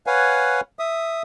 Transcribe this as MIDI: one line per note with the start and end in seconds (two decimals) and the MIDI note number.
0.07 0.61 71
0.07 0.61 73
0.07 0.61 77
0.07 0.61 78
0.07 0.61 80
0.79 1.23 76
0.79 1.23 87